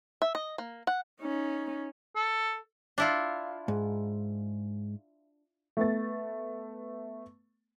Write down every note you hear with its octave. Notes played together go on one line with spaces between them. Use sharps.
E5
D#5
A#3
F#5
C#4 D#4
A4
D4 E4 F4
G#2
A3 B3 A6